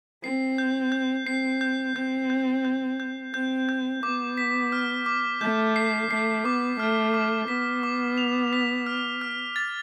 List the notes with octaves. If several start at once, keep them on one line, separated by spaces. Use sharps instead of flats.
C4 C7
G6
G6
C4 C7
G6
C4 G6
G6
G6
G6
C4 G6
G6
B3 D6
B6
F6
D6
A3 G6
C7
A3 C7
B3 D6
A3 F6
D6
B3 B6
D6
F7
B6
F6
F6
A6